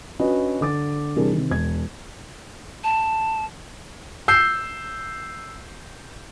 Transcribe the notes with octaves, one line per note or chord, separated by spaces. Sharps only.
C#4 D4 F#4 B4 D#5
D3 D6 A6
C3 E3 G3 D4 G#4 A#4
C3 D#3
E1 G#6
A5
E6 G6 C7